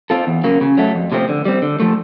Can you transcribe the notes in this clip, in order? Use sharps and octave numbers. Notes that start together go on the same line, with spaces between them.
C4 F4 A4
E2
C#3 F#3 A#3
C#3
F#3 A3
F2
C3 F3 A3 C4
D3
G3 C4
D3
F3 A3